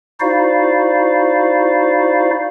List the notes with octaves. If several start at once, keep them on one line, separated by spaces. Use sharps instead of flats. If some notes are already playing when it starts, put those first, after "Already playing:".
D#4 E4 F#4 C5 D5 F5